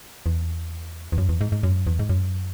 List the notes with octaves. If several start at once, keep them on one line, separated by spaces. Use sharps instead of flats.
E2
E2
F#2
E2
G#2
G#2
F#2
E2
G#2
F#2